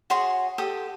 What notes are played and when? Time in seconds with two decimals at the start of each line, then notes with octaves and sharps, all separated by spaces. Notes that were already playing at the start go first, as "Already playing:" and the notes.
0.10 F#4 G#4 C#5 C6
0.58 G4 A4 D#6